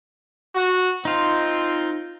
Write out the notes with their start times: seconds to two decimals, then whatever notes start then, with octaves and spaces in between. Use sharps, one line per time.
0.55 F#4
1.05 C4 D#4 F4